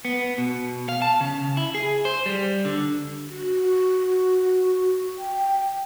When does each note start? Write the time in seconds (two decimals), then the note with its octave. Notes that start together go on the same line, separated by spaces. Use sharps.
0.05 B3
0.38 B2
0.89 F5
1.02 A5
1.21 C#3
1.57 E4
1.75 G#4
2.05 C5
2.26 G3
2.65 D3
3.29 F#4
5.17 G5